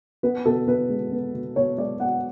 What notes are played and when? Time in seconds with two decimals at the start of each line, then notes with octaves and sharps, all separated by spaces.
0.23 B3 B4
0.45 B2 A4
0.68 B2 B4
0.90 G#3
1.12 B3
1.34 B2
1.56 B2 C#5
1.78 G#3 D5
2.00 B3 F#5